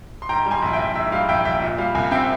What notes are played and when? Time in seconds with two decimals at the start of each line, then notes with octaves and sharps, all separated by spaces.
0.22 C6
0.29 G#2 G5 A#5
0.46 G3
0.51 G#5 C6
0.62 A#1
0.73 E5 G5
0.79 A#1
0.95 G#2 E5
1.12 G3 F5
1.29 A#1 E5 G5
1.45 A#1 E5 G5
1.62 A#2 E5
1.78 G3 F5
1.95 C2 F5 G#5
2.11 C4 E5 G5